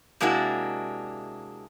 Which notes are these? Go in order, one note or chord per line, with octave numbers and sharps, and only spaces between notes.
C3 G#3 A#3 D4 E4 F#4